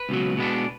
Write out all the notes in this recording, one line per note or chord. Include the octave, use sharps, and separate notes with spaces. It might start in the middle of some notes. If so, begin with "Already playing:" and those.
Already playing: B4
C#2 B2 F#3
B2 G#3 B3 D4